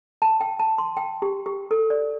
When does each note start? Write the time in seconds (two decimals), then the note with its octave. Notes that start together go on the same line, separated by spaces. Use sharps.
0.22 A5
0.41 G5
0.59 A5
0.78 C6
0.97 G5
1.22 G4
1.46 G4
1.71 A4
1.90 D5